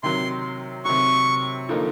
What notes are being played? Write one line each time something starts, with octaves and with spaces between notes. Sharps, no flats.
C3 D#3 F#3 C6
C3 D#3 F#3 C#6
D3 F3 A#3 D#4